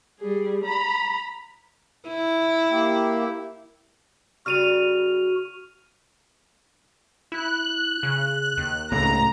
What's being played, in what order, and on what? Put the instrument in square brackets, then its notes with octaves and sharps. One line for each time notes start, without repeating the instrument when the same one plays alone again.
[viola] G3 G#4
A#5 B5
[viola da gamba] E4
[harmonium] A#3 G4 E5
[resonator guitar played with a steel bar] C#3 G3 A#4 [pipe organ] F#4 [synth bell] F6 D#7 F7
[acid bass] E4 [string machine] F#6
[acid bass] C#3
D#2
[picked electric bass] C#2 A2 [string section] A#5